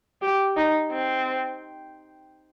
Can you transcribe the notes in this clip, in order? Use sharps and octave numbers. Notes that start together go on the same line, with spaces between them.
G4
D#4
C4